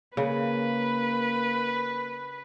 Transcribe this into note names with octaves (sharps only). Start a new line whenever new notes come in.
C#3 A#3 B4